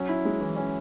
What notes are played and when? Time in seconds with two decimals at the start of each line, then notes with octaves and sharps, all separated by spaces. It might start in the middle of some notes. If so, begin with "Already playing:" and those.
Already playing: F#3 C#4
0.09 E4
0.25 G#3
0.41 E3
0.57 C#4